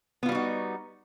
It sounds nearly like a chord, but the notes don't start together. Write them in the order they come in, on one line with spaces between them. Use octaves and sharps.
B3 F4 G3 F#4 D#4